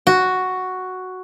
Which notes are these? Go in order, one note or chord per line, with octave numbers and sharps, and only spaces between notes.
F#4